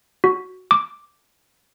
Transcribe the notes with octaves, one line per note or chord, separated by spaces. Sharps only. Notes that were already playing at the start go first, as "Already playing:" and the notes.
F#4
D6